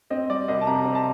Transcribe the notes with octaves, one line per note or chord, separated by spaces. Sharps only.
C4 D#5
G3 D5
C2 D#5
A5
C3 A#5
C4
A5